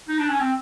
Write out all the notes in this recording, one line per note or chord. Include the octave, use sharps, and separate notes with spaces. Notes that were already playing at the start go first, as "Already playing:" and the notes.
D#4
D4
C#4
C4